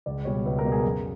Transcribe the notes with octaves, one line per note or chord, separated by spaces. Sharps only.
C#2 D5
B2 G3 C#5
C#2 B4
A#4
B2 G3
G#4
F#2